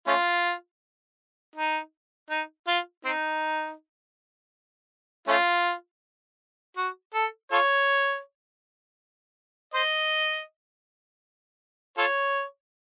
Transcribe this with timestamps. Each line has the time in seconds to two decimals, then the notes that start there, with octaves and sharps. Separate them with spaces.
0.07 A3 C#4 F4
1.56 D#4
2.30 D#4
2.68 F4
3.05 C4 D#4
5.28 A3 C#4 F4
6.77 F#4
7.14 A4
7.52 F4 A4 C#5
9.74 C5 D#5
11.98 F4 A4 C#5